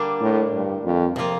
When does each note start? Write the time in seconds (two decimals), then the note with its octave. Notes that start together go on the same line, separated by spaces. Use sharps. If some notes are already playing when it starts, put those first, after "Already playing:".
Already playing: D3 G3 A#3 D4
0.21 A2
0.53 G2
0.85 F2
1.16 C3 F3 A#3 F4